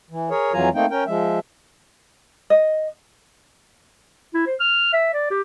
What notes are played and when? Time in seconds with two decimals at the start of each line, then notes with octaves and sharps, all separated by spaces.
0.11 E3
0.30 G#4 A#4 C#5
0.53 F2 E3 F#3 F4 G#5 A#5
0.75 A3 A#3 C4 D#4 G5
0.91 C#4 A#4 G5
1.07 F3 G#3 E5
2.50 D#5
4.34 E4
4.47 C5
4.60 F6
4.93 E5
5.14 D5
5.30 G4